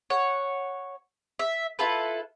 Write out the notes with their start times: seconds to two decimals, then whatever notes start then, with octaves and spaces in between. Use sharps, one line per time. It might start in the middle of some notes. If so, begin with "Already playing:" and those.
0.10 C#5 F#5
1.39 E5
1.79 E4 F4 A4 B4